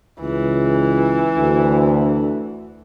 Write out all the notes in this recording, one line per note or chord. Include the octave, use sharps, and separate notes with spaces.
C#2 E3
D2